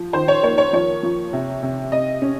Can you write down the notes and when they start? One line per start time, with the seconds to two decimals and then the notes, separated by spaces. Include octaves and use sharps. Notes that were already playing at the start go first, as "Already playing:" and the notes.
Already playing: F3
0.13 D#3 C5
0.28 C#5
0.43 A#3 C#5
0.58 C#5
0.73 F3 C#5
1.03 F3
1.33 C3
1.63 C3
1.91 C3 D#5
2.22 C#4